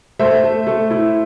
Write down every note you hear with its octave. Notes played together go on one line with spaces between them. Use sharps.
A3 C5 E5
A3
A3
E4